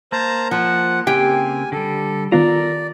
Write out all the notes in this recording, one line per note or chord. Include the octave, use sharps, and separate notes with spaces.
A#3 C5 A5 A#5
F3 F#5
C#3 A#3 C4 G4 G5 G#5
D3 G3 A4
D#3 B3 F4 A4 A#4 D5 A#5